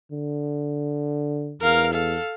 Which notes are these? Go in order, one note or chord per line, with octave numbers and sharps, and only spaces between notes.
D3
E2 A#4 F5
A4 F5